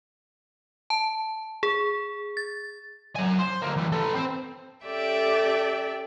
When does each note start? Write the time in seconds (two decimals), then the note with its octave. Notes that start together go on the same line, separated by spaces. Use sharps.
0.90 A5
1.63 G#4
2.37 A6
3.16 F#3 G#5
3.39 C5
3.62 D2 A#3
3.76 E3 G3
3.92 A4 B4
4.14 C4 C5
4.85 C#4 G4 A4 D5 E5 G5